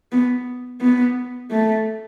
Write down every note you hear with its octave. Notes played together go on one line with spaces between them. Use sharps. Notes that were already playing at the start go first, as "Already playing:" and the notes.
B3
B3
A3